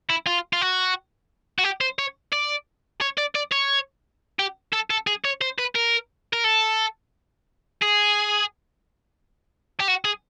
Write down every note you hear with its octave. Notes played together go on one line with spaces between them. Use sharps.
E4
F4
F4
F#4
F#4
G4
C5
C#5
D5
C#5
D5
D5
C#5
G4
A4
A4
G#4
C#5
C5
B4
A#4
A#4
A4
G#4
G4
F#4
G#4